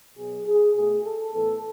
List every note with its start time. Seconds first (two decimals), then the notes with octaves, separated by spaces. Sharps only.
0.17 B2 F#3 B3 G#4
0.46 G#4
0.75 B2 A3 G#4
1.04 A4
1.33 A2 E3 B3 A4